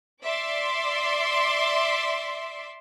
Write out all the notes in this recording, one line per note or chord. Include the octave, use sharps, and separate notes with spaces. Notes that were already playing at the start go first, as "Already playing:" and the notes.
D5 E5 C6 D6